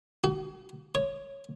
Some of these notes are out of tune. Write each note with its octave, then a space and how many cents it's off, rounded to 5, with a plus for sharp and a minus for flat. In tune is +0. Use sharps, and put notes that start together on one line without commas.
F#4 +40
C#5 -5